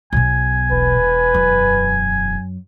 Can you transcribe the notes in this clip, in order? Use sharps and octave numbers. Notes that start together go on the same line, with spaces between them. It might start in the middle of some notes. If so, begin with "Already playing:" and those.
B1 B2 G#5
E1 B4
F#2